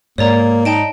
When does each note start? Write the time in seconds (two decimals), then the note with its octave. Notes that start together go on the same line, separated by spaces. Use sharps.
0.18 G#2 A#3 C#5 D5 A#5
0.65 D#4 G5 A5 D7